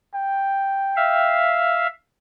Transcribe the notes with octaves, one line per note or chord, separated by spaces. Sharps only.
G5
E5 F5